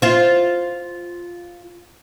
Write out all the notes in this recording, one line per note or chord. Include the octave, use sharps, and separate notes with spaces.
F4 C5